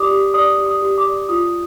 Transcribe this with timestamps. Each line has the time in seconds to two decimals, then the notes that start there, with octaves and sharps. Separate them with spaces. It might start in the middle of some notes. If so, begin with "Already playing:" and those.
Already playing: G4 D5 D6 D#6
0.11 G4
0.34 D5 D#6
0.58 G4
0.66 D#6
0.82 G4
0.98 D6
1.06 D5
1.29 F4 D#6